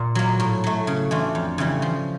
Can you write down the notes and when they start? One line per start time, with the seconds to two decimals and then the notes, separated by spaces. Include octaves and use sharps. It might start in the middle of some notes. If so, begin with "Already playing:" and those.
Already playing: A#2
0.15 F#3 A#3
0.40 A2
0.64 F#3 A3
0.87 C#3
1.11 E3 A3 D4 F4
1.35 F2
1.58 C#3 E3 G3
1.82 F3